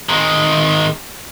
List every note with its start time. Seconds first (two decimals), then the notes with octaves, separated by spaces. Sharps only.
0.09 D#3 G#3